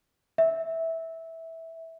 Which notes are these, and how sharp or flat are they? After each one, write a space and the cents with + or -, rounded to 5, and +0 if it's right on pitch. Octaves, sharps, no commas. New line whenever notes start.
E5 -10